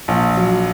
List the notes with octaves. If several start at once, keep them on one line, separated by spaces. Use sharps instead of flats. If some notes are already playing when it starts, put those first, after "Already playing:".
A#1
F#3